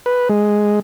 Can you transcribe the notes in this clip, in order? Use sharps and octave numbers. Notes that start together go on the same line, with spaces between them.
B4
G#3